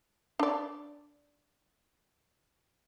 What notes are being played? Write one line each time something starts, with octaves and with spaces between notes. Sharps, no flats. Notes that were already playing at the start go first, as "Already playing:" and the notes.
D4 D5